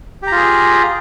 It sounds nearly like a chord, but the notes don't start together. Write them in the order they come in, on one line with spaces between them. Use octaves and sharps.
G4 A#5 F4 G#4